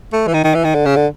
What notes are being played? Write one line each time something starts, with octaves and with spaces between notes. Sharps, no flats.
A3
E3
D#3
D#3
E3
D#3
D3
C#3
D3